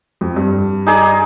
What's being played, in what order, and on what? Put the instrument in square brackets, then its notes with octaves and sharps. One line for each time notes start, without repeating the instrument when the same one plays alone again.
[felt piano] F2
G2
[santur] D#4 G#4 D5